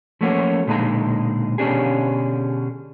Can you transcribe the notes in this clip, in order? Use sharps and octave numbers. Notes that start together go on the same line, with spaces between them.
F3 A3 A#3 C#4 F#4
B1 A#2 D3 G#3 D#4 A#5
B2 D3 C#4 D4 G4 G#4